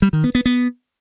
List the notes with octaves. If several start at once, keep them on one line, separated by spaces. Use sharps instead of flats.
G3
D#3
B3
B3
B3